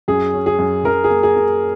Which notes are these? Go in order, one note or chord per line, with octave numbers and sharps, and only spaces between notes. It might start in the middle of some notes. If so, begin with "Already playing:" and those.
F#2 G#4
C#4
G#4
F#2
F#2 A#4
G#4
A#3
G#4
A#3